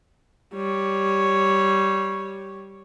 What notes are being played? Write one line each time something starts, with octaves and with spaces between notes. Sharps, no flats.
G3 C#5